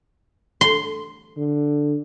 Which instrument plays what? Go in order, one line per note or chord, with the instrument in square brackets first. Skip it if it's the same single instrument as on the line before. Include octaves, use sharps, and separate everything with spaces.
[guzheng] C6
[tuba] D3